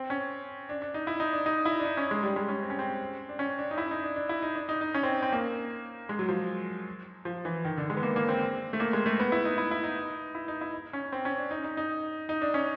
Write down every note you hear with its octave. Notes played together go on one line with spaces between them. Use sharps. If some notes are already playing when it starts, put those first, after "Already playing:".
Already playing: C4
C#4
D4
D4
D#4
E4
D#4
D4
D#4
E4
D4
D#4
C#4
G#3
G3
G#3
C#4
C4
C#4
C4
D4
C#4
D4
D#4
E4
D#4
D4
D4
E4
D#4
D4
D#4
D#4
C#4
C4
C4
A#3
G#3
F#3
F3
F3
E3
D#3
D3
G#3
B3
A#3
A#3
C4
A3
A#3
G#3
A3
B3
E4
D#4
E4
E4
D#4
E4
D#4
E4
C#4
C4
C#4
D4
D#4
D#4
D#4
D#4
D4
C#4